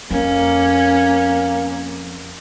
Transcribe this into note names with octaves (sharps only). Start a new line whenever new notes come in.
F2 A#3 C#4